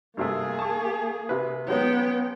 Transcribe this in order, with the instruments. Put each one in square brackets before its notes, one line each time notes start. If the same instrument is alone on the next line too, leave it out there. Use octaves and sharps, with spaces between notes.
[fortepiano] G2 C3 A3 [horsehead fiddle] A#3 G#4
[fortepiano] A5 C#6
C3 B4
[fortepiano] F#3 G#3 C#4 [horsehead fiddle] B3 G5